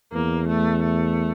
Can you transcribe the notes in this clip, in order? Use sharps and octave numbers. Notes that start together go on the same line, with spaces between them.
E2 A#3
A3
A3